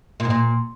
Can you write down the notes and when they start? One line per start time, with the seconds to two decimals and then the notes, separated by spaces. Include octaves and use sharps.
0.20 A#2
0.25 G#2
0.30 A#2